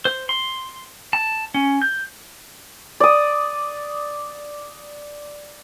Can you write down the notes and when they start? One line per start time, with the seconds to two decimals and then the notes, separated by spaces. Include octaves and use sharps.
0.05 C5
0.29 C6
1.13 A5
1.54 C#4
1.82 G6
3.00 D5 D#6